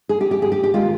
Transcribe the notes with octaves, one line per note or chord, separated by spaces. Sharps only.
G#4
G4
G4
G#4
G4
G4
D#3 G#3 F4